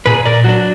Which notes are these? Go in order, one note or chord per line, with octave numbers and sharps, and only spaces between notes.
A#2 G#4 B4
A#4 D5
F#3 D4 F#4